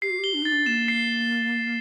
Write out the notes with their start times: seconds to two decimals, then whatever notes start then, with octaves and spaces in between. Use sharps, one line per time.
0.02 G4 C7
0.10 F#4
0.19 G4
0.24 G7
0.34 D4
0.42 D#4 A6
0.52 D4
0.66 A#3 E7
0.88 C7